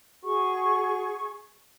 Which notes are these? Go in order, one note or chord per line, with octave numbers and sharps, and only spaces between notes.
F#4 G#4 C#6